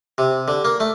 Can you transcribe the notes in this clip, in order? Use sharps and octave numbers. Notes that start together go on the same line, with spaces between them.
C3
D3
A#3
A3